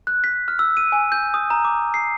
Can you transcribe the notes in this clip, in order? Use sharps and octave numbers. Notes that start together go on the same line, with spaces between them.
F#6
B6
F6
E6
D#7
G#5
G6
D#6
A#5
D6
C7